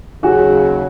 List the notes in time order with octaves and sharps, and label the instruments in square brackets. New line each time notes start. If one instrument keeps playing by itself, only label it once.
[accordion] D#2 C#3 F#3 [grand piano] F#4 G#4